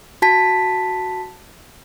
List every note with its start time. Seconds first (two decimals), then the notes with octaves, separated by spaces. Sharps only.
0.22 F#4 A5 B6